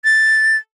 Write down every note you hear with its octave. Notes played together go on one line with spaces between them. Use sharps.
A6